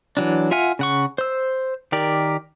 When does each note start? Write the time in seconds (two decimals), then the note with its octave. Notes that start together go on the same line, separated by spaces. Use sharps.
0.17 E3 F#3 D4
0.51 F4 E5 F#5 G#5 F6
0.79 C#3 F#5 C#6
1.18 C5 E6
1.92 D#3 G4 A#4 D5